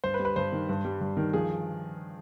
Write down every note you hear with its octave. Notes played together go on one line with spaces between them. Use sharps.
G2 C5
B4
G3
B4
G2 C5
D#3
G2
G3
G2
D#3
F3 G#4